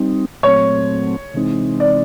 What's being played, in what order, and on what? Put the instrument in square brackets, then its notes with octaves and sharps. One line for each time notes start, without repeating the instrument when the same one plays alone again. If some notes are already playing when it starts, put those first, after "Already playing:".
Already playing: [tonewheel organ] G3 C4 D#4
[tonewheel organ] A#2 F#3 A3 C4 [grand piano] C#5
[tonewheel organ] C3 E3 G#3 C4 D#4
[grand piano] D5